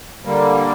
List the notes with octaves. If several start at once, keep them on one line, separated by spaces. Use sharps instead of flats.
D3 G3 A#3